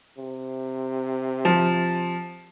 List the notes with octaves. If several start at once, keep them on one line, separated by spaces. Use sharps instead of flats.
C3
F3